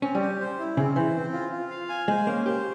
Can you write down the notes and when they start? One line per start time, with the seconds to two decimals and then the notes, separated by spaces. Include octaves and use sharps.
0.02 C4 C#4
0.15 G3
0.20 G4
0.40 C5
0.59 E4
0.77 C#3 C4
0.96 E3 C5
1.14 C4
1.33 F4
1.52 F4
1.71 F5
1.89 G#5
2.08 G#3 C5
2.27 A#3 C#4
2.46 G4 C5